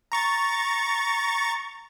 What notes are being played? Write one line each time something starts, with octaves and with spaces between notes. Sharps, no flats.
A#5 C#6 A6